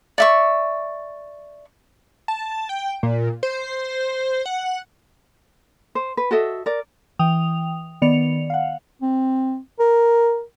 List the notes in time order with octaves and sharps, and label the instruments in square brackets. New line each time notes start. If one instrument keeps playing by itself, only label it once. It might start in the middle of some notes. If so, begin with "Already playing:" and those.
[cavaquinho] D5 E5 C#6
[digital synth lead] A5
G5
A#2
C5
F#5
[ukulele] C5
B4
F#4 A4 D#5 E5
A#4 D5
[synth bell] E3 G5 D#6 F7
D#3 B3 D5 C#7 F7
F5 F#5
[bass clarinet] C4
A#4